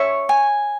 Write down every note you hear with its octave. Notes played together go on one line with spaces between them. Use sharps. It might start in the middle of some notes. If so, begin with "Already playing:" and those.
Already playing: C#5 E5 C#6
G#5